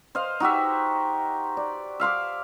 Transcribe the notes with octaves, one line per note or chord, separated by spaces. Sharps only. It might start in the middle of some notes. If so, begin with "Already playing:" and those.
C5 D#5 F5
D#4 F#4 G4 E5
D5
E5 F5 C6 D6